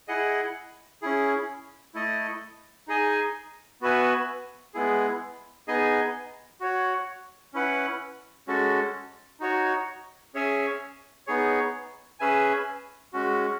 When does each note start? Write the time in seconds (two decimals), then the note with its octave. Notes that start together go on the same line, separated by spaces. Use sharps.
0.08 E4 G#4 D#5 F#5
1.02 C#4 E4 G#4
1.94 A3 E4 A4 D#5
2.88 D#4 G#4 D#5 G#5
3.81 B3 F#4 B4 E5 G#5
4.74 G#3 B3 E4 G#4
5.68 B3 D#4 G#4 D#5 G#5
6.61 F#4 C#5 F#5
7.53 C#4 E4 B4 F#5
8.48 G#3 C#4 F#4 A4
9.40 D#4 F#4 C#5
10.34 C#4 G#4 C#5 E5 G#5
11.27 B3 D#4 G#4 C#5
12.20 C#4 G#4 B4 E5 G#5
13.13 G#3 C#4 F#4